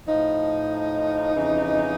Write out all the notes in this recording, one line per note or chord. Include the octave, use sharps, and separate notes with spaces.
A2 F3 D#4
F2 C#3 E3